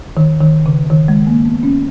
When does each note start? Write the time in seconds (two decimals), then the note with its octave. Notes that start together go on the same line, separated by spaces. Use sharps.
0.17 D#3
0.41 D#3
0.66 C#3
0.90 D#3
1.08 G#3
1.27 A#3
1.45 B3
1.63 C#4